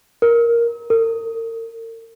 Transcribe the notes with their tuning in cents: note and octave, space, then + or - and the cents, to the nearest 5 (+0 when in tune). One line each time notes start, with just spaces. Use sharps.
A#4 +5
A#4 -40